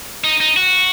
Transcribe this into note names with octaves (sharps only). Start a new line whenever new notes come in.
D#4
D#4
F#4